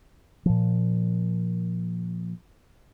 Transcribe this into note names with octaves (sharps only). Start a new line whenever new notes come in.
A#2 F3